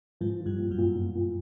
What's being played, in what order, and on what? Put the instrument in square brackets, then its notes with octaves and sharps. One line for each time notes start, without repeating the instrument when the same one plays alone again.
[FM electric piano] G#2 G#3 [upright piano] F3
[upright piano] F3
[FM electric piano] G2 G3
[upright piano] A#2
[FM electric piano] F#2 F#3
[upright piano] A#2
A#2
A#2